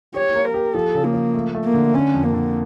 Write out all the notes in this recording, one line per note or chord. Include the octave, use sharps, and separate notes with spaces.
G4 C#5
A#3
A#4
G4
F3 A4
C#3
A#3
F3
A3
A3
A#3
D3
D3 C#4
F2
A#3
D3